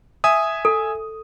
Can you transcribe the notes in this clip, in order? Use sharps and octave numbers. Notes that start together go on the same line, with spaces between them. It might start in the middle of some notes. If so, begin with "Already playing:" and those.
E5 G#5 D#6
A4